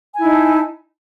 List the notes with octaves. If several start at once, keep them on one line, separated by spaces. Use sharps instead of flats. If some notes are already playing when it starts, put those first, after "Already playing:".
D#4 E4 G#5 A5